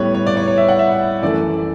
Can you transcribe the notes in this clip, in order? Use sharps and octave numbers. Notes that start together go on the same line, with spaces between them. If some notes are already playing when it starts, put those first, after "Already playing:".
Already playing: A2 G3 B3 B4 C#5
C#5
D5
C#5
C#5
E5
F#5
E5
F#2 E3 A3 D5